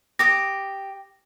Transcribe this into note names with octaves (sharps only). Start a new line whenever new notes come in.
G4 D6 D#6 A#6